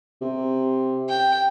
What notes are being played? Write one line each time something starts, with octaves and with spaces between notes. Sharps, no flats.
C3
G5